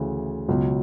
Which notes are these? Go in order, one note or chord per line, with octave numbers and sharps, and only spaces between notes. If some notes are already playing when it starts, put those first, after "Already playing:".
Already playing: D2 C#3 E3
C#2 B2 F#3